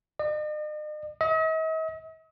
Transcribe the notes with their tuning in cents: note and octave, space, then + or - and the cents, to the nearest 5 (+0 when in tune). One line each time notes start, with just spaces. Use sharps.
D#5 -45
D#5 +45